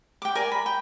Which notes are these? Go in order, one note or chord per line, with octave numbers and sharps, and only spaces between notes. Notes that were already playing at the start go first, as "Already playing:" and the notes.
G5 D6
A#4 D5 G#5
B5
G5